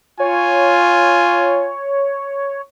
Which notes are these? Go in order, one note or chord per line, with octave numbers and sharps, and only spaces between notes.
F4 C#5 G#5